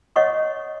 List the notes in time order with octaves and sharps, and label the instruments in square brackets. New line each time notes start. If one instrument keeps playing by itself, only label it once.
[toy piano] C#5 D#5 F#5 C#6 D#6